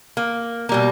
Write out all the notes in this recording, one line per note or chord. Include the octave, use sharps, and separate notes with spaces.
A#3
B2 G3 A#3